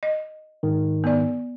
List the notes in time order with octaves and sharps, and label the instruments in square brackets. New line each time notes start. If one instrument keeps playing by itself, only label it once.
[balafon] D#5
[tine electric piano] G#2 D#3
[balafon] B3 D5